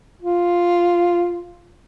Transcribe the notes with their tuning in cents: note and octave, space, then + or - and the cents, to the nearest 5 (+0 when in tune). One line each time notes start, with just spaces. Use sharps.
F4 +0